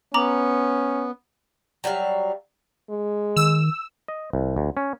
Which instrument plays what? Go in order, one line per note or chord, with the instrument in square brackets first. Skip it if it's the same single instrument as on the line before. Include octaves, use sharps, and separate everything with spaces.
[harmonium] B3 [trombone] C#4 [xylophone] A#5 D6 F#7
[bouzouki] F#3 G3 E5 F5
[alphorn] G#3
[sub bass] D#3 [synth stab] E6
[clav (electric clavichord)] D#5
C2
D2
C#4